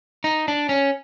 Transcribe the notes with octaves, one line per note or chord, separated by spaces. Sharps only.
D#4
D4
C#4